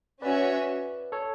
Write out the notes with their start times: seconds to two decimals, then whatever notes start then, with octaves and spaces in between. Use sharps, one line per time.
0.22 C#4 F#4 B4 C#5 D5 E5
1.12 A4 C#5